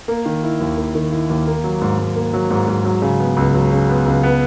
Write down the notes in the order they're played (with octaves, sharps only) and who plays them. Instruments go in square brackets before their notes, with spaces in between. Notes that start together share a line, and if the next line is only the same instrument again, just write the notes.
[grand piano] A#3
D#3
E4
D#2
A#3
D#3
E4
D#2
A#3
F#3
G#2
G#2
A#3
F#3
G#2
G#2
F#3
C#3
B3
C#2
F#3
C#3
B3
C#2
B3